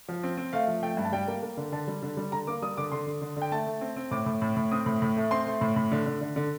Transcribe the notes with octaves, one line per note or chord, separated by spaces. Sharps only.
F3
C4
C4
A3 F5
F3
A3 G5
G2
A5
G3 G5
A#3
A#3
D3
D3 A5
G3
D3
G3
D3 A#5
A#3 D6
G3 D#6
D3 D6
D3 C6
D3
D3
D3
G5
A3 A5
A3
C4
C4
A2 D6
A2
A2
A2
C4 D#6
A2
A2
A3
C4 C6
A3
A2
A2
D3
D3
D3
D3